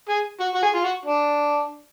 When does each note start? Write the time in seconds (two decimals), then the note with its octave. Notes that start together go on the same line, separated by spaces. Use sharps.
0.09 G#4
0.40 F#4
0.55 F#4
0.63 G#4
0.74 F4
0.84 F#4
1.05 D4